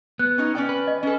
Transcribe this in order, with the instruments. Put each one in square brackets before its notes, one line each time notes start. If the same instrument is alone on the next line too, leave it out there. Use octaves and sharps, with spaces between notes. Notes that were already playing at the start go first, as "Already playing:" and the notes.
[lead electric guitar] B3 [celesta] F#6
[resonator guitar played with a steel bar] C#4 D#4
C#4 D5 G5
[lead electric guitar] B4
[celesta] D#5
[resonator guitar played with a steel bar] C#4 A4